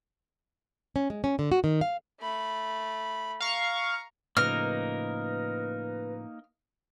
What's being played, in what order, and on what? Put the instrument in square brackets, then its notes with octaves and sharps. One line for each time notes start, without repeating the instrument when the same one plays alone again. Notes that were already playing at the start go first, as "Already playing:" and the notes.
[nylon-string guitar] C#4
G#3
C#4
D3
F#4
D#3
F5
[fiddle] A3 B5
[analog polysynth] F5 C#6 [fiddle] A#5
[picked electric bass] A2 C#3 F3 [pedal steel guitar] A#3 D#4 A#4 [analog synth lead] B4 [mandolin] F6